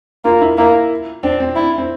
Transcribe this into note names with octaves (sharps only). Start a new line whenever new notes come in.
A#3 F4
E4
A#3 E4
C4 D4
C4
D4 E4
C4